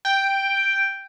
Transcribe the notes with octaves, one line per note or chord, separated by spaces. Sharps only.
G5